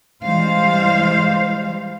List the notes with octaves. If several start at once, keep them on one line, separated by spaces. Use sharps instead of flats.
E3 G3 G#3 C5 F5